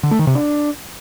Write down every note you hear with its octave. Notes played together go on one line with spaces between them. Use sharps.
D3
A3
D#3
C3
D4